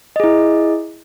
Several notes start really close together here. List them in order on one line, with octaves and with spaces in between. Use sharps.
D#5 G#4 E4